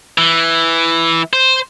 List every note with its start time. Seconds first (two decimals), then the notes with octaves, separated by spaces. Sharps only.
0.18 E3
1.33 C5